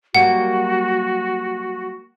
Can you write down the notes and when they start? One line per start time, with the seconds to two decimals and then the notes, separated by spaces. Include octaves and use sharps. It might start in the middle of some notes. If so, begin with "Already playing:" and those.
0.15 F#3 G3 A#3 F#4 F#5